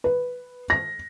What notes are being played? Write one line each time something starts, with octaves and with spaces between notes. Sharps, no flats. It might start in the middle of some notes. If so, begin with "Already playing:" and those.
B4
A#6